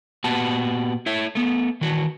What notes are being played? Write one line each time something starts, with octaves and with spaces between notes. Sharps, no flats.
A#2 B3 F#4 G4 A5
E4 C#5 E5
A3 B3
D#3 E3 F#4